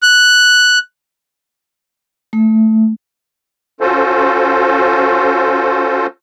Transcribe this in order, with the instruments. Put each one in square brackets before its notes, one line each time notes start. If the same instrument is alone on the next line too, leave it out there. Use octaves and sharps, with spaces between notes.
[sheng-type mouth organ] F#6
[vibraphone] A3
[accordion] C#4 F4 F#4 A4 C5